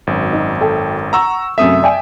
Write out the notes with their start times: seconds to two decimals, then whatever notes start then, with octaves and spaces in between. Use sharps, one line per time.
0.07 G#1 F#2
0.33 D#4
0.61 A4 G5
1.13 F#5 A#5 C#6 E6
1.58 F#2 C3 A3 E5 D#6
1.83 D5 G5 G#5